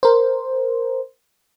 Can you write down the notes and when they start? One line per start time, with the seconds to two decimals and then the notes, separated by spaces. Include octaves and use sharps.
0.03 A#4 C5